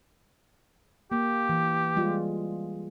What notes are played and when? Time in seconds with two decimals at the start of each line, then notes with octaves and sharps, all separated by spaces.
1.12 A#3 G4
1.49 E3
1.96 G3 G#3 F4